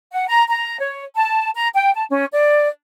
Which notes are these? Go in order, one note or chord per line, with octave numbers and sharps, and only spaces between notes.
F#5
A#5
A#5
C#5
A5
A#5
G5
A5
C#4
D5